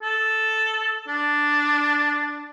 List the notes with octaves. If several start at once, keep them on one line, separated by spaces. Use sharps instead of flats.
A4
D4